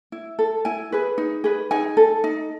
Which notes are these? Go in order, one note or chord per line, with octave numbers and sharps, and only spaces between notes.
E4
A4
E4 G#5
G#4 B4
D#4
G#4 B4
D#4 G#5
A4
D#4